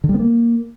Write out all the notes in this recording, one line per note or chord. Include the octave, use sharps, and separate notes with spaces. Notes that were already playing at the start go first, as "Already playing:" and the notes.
D3
G3
B3
A#3